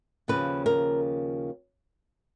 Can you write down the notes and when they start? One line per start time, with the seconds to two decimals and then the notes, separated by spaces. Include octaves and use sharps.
0.28 D#2 C#3 F3 B4
0.66 A#4